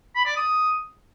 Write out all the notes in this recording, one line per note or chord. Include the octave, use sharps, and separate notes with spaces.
B5
D5
D#6